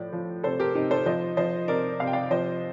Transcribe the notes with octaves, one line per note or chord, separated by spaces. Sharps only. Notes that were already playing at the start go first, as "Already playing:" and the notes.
Already playing: A2 F3 D5
F3
C3 A4 C5
G4 A#4
C3 D#4 G4
A4 C5
F3 C5 D#5
F3 C5 D#5
C3 A#4 D5
C3 F5
G5
D5 F5
F3 C5 D#5